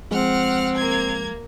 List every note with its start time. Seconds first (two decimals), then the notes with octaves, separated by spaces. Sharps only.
0.11 F3 G#3 C4 F#5 F6
0.76 A#3 G#6